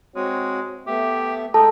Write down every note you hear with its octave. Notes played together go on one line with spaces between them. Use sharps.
G#3 C4 F#4 C#5
A3 B3 G4 E5
G#3 D#4 A4 G5 A5